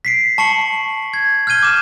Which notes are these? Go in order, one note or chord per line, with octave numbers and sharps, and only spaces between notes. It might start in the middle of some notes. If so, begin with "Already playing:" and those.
B6 C7 D7
A5 C#6 C7 C#7 F#7
G#6
F6 G6 G#6 D#7 G7
D6 E7